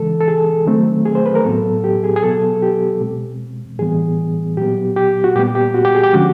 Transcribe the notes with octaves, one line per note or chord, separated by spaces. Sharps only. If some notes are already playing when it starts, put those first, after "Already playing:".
Already playing: C#3 E3 G#3 A4
A4
G#4
D#3 F#3 A3 C4
G#4
C5
B4
A#4
A2 F#3 B3 A4
G4
G#4
G#4
B2 F#3 B3 A4
G4
B2 G#3 C4
A2 E3 G3 B3 G#4
A#2 F#3 B3 G4
G4
F#4
A#2 G3 B3 G4
G4
F#4
G4
G#4
G4
D3 F3 G#3 C#4 F#4